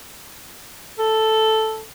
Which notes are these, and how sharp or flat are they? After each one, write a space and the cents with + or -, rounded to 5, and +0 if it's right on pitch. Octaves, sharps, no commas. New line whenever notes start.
A4 +0